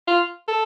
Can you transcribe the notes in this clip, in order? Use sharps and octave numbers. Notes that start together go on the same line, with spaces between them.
F4
A4